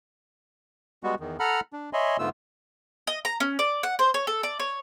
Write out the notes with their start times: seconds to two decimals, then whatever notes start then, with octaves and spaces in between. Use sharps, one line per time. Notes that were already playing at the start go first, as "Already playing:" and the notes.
1.04 G3 G#3 B3 F#4
1.20 E2 D#3
1.40 A4 F#5 A#5 B5 F6
1.73 D4
1.93 C#5 D#5 E5 G#5 B5 C6
2.19 G#2 D3 A3 B3 F4 E6
3.07 D#5
3.25 A#5
3.40 C#4
3.59 D5
3.83 F#5
3.99 C5
4.14 C#5
4.27 A4
4.43 D5
4.60 C#5